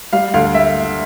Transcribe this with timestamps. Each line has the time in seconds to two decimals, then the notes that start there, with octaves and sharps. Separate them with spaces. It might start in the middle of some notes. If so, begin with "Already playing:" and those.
0.13 G3 F5
0.34 D2 F5
0.55 E5